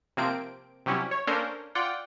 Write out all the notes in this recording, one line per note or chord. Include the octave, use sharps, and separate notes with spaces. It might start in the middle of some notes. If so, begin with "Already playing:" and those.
C3 F3 A#3 C4 D7
C3 F#3 G3 C#4 E4
C#5
A#3 C#4 D4 A4 A#4 C5
F4 D5 F#5 G5